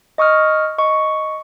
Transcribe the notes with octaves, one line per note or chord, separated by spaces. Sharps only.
D#5 C#6 D#6 F6
D#5 C#6